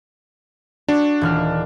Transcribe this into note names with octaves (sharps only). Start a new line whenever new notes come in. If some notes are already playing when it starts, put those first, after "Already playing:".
D4 F#4
D#1 E3 F6